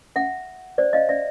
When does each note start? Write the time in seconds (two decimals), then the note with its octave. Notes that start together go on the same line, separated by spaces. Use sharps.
0.16 E5 F#5
0.78 C5 D5
0.93 D#5 F5
1.09 D5 E5